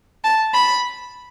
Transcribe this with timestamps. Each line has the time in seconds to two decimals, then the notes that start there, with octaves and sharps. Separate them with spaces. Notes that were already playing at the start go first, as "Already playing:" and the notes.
0.24 A5
0.54 B5